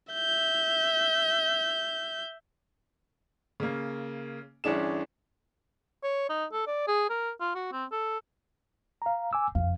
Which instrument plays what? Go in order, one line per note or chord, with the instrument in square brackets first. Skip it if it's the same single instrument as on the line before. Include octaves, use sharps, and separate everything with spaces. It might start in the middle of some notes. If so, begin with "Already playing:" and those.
[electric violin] E5 G6
[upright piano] C#3 A#3
G1 E3 C#4 D4 G#4 E7
[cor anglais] C#5
D#4
A4
D5
G#4
A#4
F4
F#4
C4
A4
[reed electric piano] F5 A#5
G#5 D6 E6
[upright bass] F#1 F2 [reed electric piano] F5